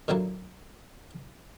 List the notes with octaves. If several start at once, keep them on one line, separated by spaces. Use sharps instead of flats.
A#2 D3 F#3 A#3 E4